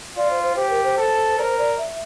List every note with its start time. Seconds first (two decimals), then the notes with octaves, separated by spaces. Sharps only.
0.16 F4 D5
0.31 C5
0.44 C5
0.56 G4 C5
0.70 A#4
0.83 C5
0.97 A4
1.38 A#4 C5 D5
1.58 D5
1.78 E5